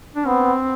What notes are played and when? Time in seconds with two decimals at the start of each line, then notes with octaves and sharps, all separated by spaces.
0.15 D4
0.26 B3 C4